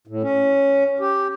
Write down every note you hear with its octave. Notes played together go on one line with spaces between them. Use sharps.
A2
C#4
G4